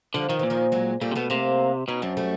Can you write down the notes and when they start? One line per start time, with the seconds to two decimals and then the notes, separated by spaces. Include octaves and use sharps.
0.14 D3 F3 G3
0.29 D#3 F3
0.39 A#2 E3
0.50 D#3 F3
0.72 F#3 G#3
1.01 A#2 G3 A3
1.11 C3
1.15 B2 A3 B3
1.30 C3 A#3 C4
1.88 B2 C#4 D#4
2.02 F#2 C4 D4
2.17 G3 A3